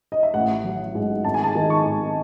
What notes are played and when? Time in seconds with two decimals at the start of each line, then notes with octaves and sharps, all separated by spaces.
0.12 D#5
0.23 E5
0.34 A1 F#5
0.64 F#3
0.95 G#2
1.24 G#1 A5
1.34 G#5
1.44 A5
1.55 D#3
1.70 C#6
1.86 G#2